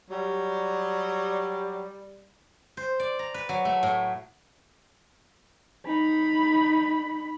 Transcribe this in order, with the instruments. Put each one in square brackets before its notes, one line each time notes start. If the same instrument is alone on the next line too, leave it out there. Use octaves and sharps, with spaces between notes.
[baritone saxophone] F#3 [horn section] G3
[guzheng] C5
D5
A#5
B4
F#3
A3
A2
[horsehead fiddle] D#4 B5